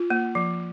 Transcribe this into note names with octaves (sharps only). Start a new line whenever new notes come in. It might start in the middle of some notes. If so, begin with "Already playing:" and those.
Already playing: F4
A#3
F3